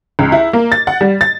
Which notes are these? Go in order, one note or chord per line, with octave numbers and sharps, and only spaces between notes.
C#2
E4
A#3
A6
F#5
G3
A6